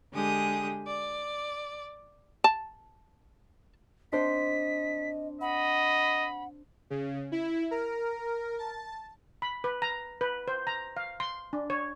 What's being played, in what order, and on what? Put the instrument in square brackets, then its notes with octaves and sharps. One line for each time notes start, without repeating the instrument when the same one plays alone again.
[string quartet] D3 G#3 G4 G#4 D#6
D5
[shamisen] A5
[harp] C4 D4 C5 [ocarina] D#5 [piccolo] B6
[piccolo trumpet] D#5 [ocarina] F#5 [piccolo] B5
[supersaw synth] C#3
E4
A#4
A5
[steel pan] B5
B4
A#5
B4
C5
A#5
F5
C6
D4
C#5